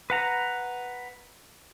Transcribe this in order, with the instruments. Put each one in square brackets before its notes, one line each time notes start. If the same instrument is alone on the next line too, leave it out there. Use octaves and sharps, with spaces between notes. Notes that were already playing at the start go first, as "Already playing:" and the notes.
[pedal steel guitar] B4 F#5 A#5